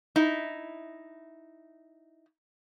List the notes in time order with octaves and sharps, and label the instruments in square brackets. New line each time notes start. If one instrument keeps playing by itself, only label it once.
[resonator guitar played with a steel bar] D#4 E4